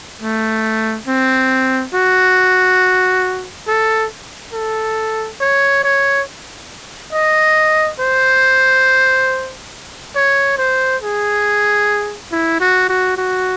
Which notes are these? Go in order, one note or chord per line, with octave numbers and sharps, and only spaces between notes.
A3
C4
F#4
A4
A4
C#5
C#5
D#5
C5
C#5
C5
G#4
E4
F#4
F#4
F#4